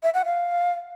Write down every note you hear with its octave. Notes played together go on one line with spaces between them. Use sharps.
E5
F#5
F5